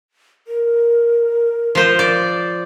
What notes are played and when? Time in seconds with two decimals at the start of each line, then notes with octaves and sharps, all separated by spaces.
0.47 A#4
1.75 F3 C5
1.99 D5